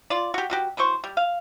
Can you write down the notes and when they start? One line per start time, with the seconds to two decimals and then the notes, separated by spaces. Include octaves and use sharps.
0.10 F4 D5
0.34 F#4 G4
0.50 B2 F#4 G4
0.77 E3 F#3 C5 C#6
1.04 G3
1.17 F5